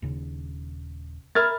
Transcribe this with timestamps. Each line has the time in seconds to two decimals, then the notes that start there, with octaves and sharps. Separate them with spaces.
0.02 D#1 C#3
1.35 A#4 E5 B5 F6 G#6 A6